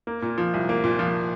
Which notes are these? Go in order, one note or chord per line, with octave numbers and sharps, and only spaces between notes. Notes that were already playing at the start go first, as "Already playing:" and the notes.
A#3
A#2
F3
C2
A#3
A#2
F3